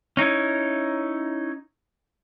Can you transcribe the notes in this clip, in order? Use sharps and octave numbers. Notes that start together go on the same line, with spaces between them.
C#4 D#4 E4 C#5